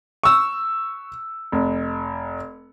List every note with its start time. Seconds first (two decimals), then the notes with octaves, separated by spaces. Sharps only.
0.24 C#6 E6
1.52 F1